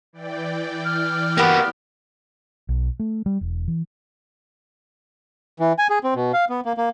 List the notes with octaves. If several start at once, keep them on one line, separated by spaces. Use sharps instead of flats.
E3 D5 G5
F6
A#3 B3 F#4 G4
B1
A3
G3
E1
E3
E3
G#5
G#4
C4
B2
F5
B3
A#3
A#3